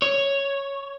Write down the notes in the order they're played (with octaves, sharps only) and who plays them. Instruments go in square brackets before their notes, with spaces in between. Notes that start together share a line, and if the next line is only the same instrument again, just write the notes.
[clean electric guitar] C#5